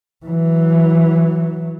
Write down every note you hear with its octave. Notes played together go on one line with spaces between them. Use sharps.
E3 F#3